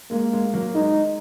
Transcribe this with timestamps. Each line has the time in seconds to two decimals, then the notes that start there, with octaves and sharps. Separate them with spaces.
0.11 G#3 A#3
0.33 G#3
0.54 F#3 A#3
0.75 G#3 D#4